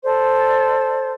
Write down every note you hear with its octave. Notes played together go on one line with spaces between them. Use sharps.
A4 C5 D5